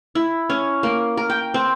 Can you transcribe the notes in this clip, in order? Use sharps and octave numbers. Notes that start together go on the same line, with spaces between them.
E4
C#4
A#3
A#4
G5
C4